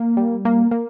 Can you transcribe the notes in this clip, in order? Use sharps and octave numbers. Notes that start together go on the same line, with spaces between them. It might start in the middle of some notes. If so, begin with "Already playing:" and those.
Already playing: A#3
G3
A#3
A#3